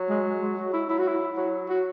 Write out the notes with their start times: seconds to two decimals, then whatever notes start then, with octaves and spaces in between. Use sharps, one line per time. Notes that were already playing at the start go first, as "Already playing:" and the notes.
Already playing: F#3
0.09 G#3
0.41 G#3
0.57 F#4
0.73 E4
0.89 F#3 E4
0.98 F#4
1.07 E4
1.37 F#3 F#4
1.69 F#4